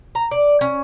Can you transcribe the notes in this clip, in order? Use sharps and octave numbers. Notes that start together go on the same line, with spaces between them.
A#5
D5
C#4